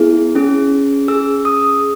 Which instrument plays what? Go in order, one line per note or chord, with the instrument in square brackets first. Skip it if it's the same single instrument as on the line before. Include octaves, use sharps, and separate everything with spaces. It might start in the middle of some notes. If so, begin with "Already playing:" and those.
Already playing: [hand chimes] B3 E4 G#4
C#4 G#4
C#4 G#4 E6
D#6